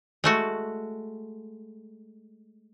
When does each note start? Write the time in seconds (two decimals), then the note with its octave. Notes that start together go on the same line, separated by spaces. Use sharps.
0.24 G#3 A3 F#4